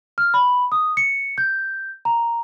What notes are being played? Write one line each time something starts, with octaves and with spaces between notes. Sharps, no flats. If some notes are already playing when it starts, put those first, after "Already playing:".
F6
B5
D#6
C#7
G6
A#5